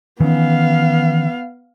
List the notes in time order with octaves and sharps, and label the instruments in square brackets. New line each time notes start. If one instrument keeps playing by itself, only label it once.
[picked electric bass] D#3 E3 C#4 [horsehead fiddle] B3 F5